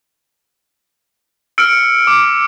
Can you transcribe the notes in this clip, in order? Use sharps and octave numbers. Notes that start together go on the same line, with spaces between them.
E6 F6 C#7 D7
D6